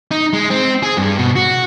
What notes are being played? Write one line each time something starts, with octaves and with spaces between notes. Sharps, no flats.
D#4
G#3
C4
G#4
G2
B2
F#4